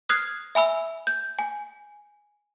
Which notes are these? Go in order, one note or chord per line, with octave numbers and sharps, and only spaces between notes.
D#6 F6 F#6 G#6 C7
E5 G#5 B5 E6
G6
G#5